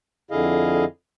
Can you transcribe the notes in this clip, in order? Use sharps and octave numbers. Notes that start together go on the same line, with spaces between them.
F2 D3 E4 G#4 D#5 F5